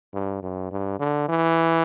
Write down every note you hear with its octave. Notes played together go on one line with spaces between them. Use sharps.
G2
F#2
G2
D3
E3